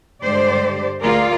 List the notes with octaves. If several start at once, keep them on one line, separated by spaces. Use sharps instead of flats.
G2 D3 G#3 G4 C5 D5
D2 F4 G#4 A#4 D5